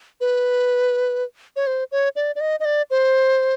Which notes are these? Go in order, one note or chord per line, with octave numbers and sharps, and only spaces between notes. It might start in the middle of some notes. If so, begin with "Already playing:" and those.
B4
C#5
C5
C#5
D5
D5
D#5
D#5
D5
C5